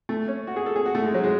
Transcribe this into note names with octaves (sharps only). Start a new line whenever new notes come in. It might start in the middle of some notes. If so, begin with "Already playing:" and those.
A3
C#4
F#4
G#4
A4
G#4
F#4
A3
G#3
F#3
G#3